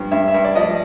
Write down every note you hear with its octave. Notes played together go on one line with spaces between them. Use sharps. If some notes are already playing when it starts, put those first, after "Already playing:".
Already playing: G2 F3
G2 E5
E5
G2
D5
F3 D#5
D5